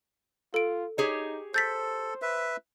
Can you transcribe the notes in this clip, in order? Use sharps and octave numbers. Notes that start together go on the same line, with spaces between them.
F4 A4 D7
D#4 G4 G#4 C#5
A4 C5 G6 A6 B6
B4 E5